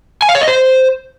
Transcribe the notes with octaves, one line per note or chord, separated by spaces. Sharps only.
G#5
F5
C#5
D#5
C5